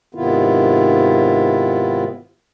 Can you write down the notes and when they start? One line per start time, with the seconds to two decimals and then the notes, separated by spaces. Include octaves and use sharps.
0.15 G#2 C3 D#3 B3 E4 F4